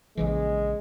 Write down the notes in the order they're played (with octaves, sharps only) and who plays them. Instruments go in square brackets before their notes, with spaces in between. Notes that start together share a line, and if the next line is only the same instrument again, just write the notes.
[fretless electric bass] A#1 C#3 E3 [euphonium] G#3